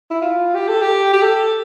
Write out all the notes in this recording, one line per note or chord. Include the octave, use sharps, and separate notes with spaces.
E4
F4
G4
A4
G4
G4
A4